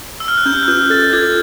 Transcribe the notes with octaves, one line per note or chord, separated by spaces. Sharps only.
E6
F6
F#6
C#4 G6
F#6
F4 G6
A4 A6
F4 G#6